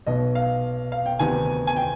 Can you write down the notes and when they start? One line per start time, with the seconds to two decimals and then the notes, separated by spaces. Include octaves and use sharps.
0.07 B1 B2 B3 D#5
0.35 F5
0.92 F5
1.06 G5
1.19 D2 C3 D#3 B3 G#5
1.67 G#5
1.76 G5